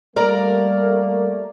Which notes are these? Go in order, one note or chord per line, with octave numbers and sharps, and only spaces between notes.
G3 A3 A#3 A#4 D5 A#5